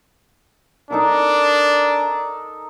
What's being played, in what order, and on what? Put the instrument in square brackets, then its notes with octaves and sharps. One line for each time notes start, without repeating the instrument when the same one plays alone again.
[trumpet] D4 [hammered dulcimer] D#4 A4 A#4